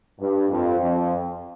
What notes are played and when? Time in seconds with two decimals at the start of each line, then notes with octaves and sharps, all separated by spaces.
0.19 G2
0.49 F2
0.80 F2